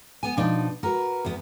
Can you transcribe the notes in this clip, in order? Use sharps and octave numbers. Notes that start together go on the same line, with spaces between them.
B3 G#5
B2 F3 D4 D#4
F#4 A#4 B4
E2 B3